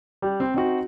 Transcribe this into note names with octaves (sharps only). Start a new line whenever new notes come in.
G3
C4
C4 D#4 F#4